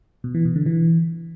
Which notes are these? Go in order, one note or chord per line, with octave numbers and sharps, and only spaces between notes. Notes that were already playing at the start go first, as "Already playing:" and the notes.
B2
E3
B2
D3
E3